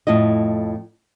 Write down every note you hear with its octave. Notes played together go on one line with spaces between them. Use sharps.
F2 A2 E4 D#5